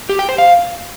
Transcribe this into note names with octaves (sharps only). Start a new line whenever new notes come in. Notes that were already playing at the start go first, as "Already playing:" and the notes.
G4
G5
C5
F5